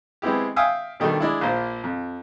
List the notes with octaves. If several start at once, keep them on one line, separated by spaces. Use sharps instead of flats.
G#3 B3 C4 E4 G4
E5 F5 G5 G#5 D#6 E6
B2 D#3 G3 A3 D4
G#3 D4 E4
A#1 A#2 C5
F2